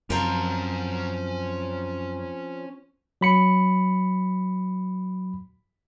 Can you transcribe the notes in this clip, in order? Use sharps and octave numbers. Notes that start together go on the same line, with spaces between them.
F#2 F3 C4 C#4 A#5
F#3 B5 C#7